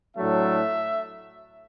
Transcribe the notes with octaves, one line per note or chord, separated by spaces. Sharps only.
A2 F#3 A3 D4 E5